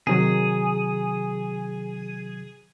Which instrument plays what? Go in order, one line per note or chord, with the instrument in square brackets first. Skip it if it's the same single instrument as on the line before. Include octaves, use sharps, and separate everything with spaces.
[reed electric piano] C3 D#3 F#3 [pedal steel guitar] G#4